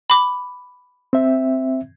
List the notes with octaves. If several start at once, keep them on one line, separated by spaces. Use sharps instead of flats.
B5 D6
C4 E5